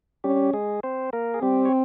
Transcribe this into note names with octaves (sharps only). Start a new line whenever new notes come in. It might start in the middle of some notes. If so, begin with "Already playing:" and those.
G3 C#4 G4
G#3 G#4
C4 C5
A#3 A#4
G#4
G3 C4 G4
C#5